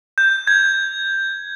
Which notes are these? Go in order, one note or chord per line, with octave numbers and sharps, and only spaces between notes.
G6
G#6